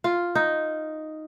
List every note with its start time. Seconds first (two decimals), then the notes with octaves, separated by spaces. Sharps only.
0.04 F4
0.35 D#4